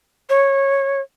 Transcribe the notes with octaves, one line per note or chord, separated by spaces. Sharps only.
C#5